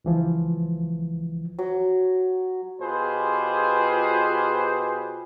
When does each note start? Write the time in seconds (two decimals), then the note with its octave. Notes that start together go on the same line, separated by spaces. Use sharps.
0.05 C#2 E3 F3
1.59 F#3
2.81 B2 F4 G4 G#4 B4 C5